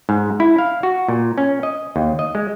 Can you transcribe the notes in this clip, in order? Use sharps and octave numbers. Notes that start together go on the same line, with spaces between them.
G#2
E4
F5
F#4
A#2
C#4
D#5
D#2
D#5
G#3